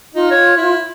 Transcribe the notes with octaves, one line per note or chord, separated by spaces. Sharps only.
D#4 F4
C#5
E4